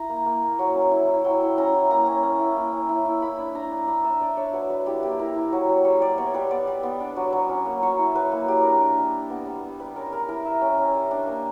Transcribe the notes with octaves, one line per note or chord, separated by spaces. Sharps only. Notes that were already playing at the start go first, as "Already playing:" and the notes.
Already playing: E4 A#5
A#3
A#3
A#3
F#3
C#4
E4
E4
F#3 G5
E4
C#4 A#5
E4
A#3 A#5
C#4
C#4
E4
A#3
C#4
E4
E4
A#3 B5
D4
D4 A#5
D4
D4 B5
D4 E5
D4 D5
D4 C#5
F#3 B4
F#3 B4
E4 G4
A#3 G4
E4 A#4
E4
F#3
F#3
G3 C#5
G3 D5
B3 C#5
G3 B4
B3 D5
G3
B3
D4
F#3
F#3
C#4
A#3
F#3 C#5
E4
F#3 B4
A#3
G3 G4
D4 A#4
G4
D4
G3
D4
B3
G3
B3
G3 B4
C#4 A#4
G3 A#4
E4 A#4
E4 E5
C#4
C#4
G3
D4
A#3